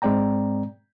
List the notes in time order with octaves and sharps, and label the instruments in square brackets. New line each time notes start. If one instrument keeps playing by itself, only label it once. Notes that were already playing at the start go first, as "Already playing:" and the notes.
[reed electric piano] G#2 G#3 C4 D5 G5 A#5